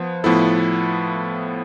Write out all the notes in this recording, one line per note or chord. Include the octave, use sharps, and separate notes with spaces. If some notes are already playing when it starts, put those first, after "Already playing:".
Already playing: F3 B3 C5
A2 F3 B3 E4 A4